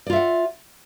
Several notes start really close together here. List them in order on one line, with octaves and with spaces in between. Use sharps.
D5 F4 E5 F#5